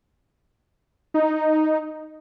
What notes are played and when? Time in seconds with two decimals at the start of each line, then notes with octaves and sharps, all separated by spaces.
1.14 D#4